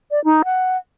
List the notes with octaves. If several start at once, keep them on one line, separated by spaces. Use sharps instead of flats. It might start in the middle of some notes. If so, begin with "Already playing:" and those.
D5
D#4
F#5